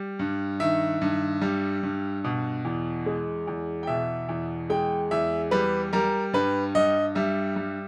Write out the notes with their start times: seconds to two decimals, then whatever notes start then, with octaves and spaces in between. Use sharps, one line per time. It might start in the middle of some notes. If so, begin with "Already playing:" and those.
Already playing: G3
0.19 G2
0.60 D#3 E5
1.01 G2
1.42 G3
1.83 G2
2.24 B2
2.65 E2
3.06 G#3
3.48 E2
3.83 G5
3.87 B2 E5
4.29 E2
4.70 G#3 G5
5.11 E2 E5
5.51 G3 B4
5.93 G3 A#4
6.33 G2 B4
6.75 G2 D#5
7.15 G3 E5
7.56 G3